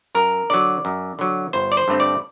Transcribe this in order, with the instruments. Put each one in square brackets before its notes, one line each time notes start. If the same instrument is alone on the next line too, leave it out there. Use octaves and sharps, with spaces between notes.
[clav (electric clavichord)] F#2 A#4
D3 F#3 D5
F#2
D3 F#3
G1 C5
D5
C5
G2 D3 A3 C4
D5